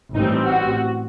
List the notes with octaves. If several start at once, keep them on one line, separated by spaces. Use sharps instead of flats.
A1 A2 G3 C4 D#4
F#4